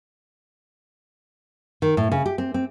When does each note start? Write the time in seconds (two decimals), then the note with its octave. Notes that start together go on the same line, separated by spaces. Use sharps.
1.82 D#3
1.97 A2
2.12 C#3
2.26 G4
2.38 C4
2.54 C4